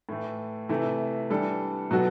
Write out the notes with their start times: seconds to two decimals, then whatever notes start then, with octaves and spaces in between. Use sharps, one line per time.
0.09 A2 E3 A3
0.69 C3 E3 A3 E4
1.30 E3 G3 D4 A4
1.91 B2 F#3 B3 F#4 A4